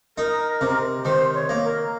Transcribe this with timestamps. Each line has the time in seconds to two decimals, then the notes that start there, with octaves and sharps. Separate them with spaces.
0.18 D#4 A#4
0.61 C3
1.05 D#3 C5
1.35 C#5
1.49 A#3
1.64 A#4